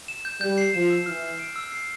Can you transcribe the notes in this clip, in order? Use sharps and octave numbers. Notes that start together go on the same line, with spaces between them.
E7
G6
G3 G6
C7
F3 E7
E6
E3 F6
C7
D7
E6
C7